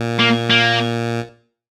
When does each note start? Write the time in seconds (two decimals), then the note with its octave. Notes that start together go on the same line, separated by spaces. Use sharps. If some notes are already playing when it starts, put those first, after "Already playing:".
Already playing: A#2
0.19 A#3
0.50 A#3